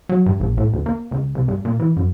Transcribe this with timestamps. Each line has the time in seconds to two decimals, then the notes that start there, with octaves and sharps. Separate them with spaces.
0.09 F#3
0.26 G2
0.40 A#1
0.58 A2
0.73 D2
0.86 A#3
1.11 C#2
1.35 C2
1.48 G2
1.65 A#2
1.80 E3
1.97 F#2